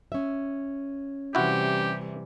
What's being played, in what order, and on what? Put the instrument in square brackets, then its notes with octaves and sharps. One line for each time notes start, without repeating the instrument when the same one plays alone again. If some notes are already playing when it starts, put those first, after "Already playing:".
[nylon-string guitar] C#4 E5
[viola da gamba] C3 E3 G3 [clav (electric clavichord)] E4 F#4 [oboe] G4